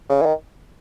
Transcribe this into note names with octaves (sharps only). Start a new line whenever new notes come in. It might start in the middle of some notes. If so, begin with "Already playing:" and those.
C#3
E3
D#3